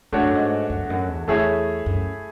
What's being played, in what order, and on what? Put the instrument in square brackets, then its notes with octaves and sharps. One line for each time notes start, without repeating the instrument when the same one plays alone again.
[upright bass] G#2 [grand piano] A3 D4 F#4 C#5
[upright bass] F#2
G#2
F#2
E2
F#2
E2
[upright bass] E2 [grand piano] A3 E4 G#4 C#5 E5
[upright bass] F#2